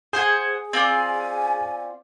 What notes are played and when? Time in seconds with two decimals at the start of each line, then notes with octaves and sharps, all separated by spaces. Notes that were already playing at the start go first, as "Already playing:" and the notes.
0.13 G#4 C5 F#5 G#5
0.73 C4 F4 D5 G#5